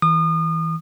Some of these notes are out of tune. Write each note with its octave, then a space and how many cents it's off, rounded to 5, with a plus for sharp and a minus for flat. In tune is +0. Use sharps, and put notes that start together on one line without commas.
E3 -25 D#6 -35